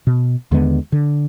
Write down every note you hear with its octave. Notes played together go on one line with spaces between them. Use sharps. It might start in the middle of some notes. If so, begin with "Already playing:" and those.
B2
D#2 D3 G#3 B3
D3